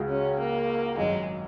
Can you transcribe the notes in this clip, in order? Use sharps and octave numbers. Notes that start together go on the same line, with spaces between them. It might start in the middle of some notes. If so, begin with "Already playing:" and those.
Already playing: C#2 C#3 G#3 F#4
C#4
A#3
G#1 F#2 F#3 G#3